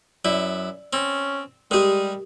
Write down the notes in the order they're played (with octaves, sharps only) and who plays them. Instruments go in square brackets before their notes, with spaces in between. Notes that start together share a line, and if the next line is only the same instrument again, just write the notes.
[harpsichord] F#2 E4 [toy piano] D5
[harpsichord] C4 [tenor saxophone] C#4
[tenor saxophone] G3 [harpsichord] G#3 G#4 [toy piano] G4 A#4